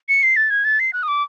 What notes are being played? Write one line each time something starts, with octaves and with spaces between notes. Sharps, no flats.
C#7
C7
A6
G#6
A6
C7
F#6
D#6
D6